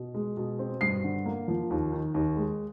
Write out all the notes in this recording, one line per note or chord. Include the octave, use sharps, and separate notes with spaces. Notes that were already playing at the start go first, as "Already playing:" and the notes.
Already playing: B2
G#3
B2
C4
G2 C7
D3
A#3
F3
D#2
D#3
D#2
G#3